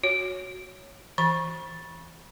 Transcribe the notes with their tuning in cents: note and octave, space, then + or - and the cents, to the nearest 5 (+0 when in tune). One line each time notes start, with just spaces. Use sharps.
F#4 +0 C#5 +0
E3 +0 B5 -35